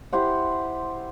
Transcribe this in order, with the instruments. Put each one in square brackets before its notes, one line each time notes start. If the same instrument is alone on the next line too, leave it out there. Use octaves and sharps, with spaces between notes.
[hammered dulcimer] E4 G4 C5 F#5